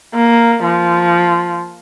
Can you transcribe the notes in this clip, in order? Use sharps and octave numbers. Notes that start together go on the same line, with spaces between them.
A#3
F3